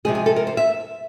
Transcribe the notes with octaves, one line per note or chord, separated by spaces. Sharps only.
C3 F3 G#3 G#4
G#4
A4
A#4
C5
E5